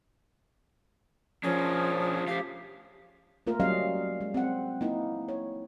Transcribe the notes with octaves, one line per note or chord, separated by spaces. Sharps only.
F3 C#4 D4 G#4 A#4
A3 G4 F5
A3 A#3 F4 A#4
F#3 G3 C#4 D#5 F5
G#3
C4 F#5
A#3 D#4 E4
C#5